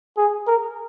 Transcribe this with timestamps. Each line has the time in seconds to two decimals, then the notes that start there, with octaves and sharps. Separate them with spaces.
0.17 G#4
0.47 A#4